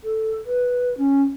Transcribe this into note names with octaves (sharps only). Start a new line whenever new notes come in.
A4
B4
C#4